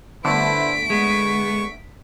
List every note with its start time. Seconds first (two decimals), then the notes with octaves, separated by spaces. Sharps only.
0.25 G1 D3 A3 E4 B4 C5 B6 D7
0.90 G#3 B3 C#6